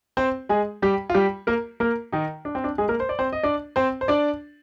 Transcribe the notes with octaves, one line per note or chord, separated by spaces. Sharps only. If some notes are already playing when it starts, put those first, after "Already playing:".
C4 C5
G#3 G#4
G3 G4
F4
G3 G4
A#3 A#4
A#3 A#4
D#3 D#4
D4
C4
D4
G#3 G#4
A#3 A#4
C5
D5
C4 C5
D#5
D4 D5
C4 C5
C5
D4 D5